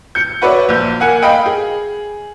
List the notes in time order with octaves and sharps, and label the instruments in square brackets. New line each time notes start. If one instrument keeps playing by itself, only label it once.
[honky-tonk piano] G6 C#7
F#4 B4 C#5 D5 E5
A#1 G6
A#3 F#5 G#5
D#5 F5 G5 B5
G#4